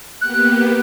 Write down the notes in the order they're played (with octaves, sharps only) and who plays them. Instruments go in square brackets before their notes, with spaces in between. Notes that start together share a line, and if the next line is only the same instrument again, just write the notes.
[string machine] A#3 B3 G4 [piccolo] F#6